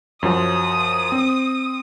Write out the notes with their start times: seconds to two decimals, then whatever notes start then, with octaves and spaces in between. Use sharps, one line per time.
0.23 F#2 F3 F#3 D#6
1.12 C4